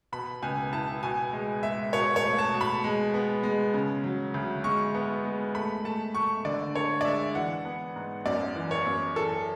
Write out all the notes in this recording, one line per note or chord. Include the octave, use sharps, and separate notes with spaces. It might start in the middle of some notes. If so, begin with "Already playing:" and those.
B2 B5
C#2 G#5
E4 A5
B2 G#5
G#3
G#3 E5
B2 C#5
C#5
A3
A5
B2
B5
G#3
B3
G#3
C#3
F#3
D2
G#3 C#6
B3
G#3
A3 B5
A3 A5
A3 C#6
D3 D5
D3 C#5
D5
G#3 E5
E3 F#5
B3
G#2
F#2 D5
E3
C#5
F#2
E3 A4